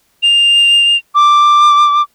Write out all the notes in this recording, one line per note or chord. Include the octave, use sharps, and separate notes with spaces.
F7
D6